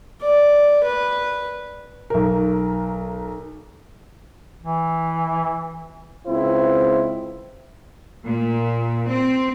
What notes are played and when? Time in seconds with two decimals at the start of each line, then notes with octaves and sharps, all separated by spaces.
0.22 D5
0.84 B4
2.10 B1 A#4
4.63 E3
6.27 C#2 C4 E4 F4 C5
8.24 A#2
9.08 C4